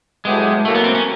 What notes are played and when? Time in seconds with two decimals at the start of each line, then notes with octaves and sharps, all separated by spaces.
0.25 A2 F#3 G#3 B3 E4 G4
0.65 B2 F#3 A3 A#3
0.75 B3
0.84 C4
0.95 C#4